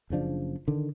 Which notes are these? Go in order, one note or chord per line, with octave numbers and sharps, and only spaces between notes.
F#1 C#3 F3 D4
D3 D#3